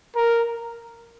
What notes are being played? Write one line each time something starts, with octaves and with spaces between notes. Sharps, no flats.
A#4